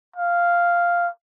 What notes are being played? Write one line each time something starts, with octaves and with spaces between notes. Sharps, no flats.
F5